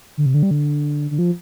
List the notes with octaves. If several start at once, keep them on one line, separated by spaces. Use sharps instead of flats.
D3
C3
D3
G3
D3
D3
F3